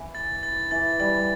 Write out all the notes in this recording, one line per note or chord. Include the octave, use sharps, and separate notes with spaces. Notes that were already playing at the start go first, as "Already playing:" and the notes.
Already playing: E3
A6
A6
E3 A6
G3 A6